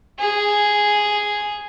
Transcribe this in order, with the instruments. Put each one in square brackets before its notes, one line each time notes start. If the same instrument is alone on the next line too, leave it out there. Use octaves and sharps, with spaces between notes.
[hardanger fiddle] G#4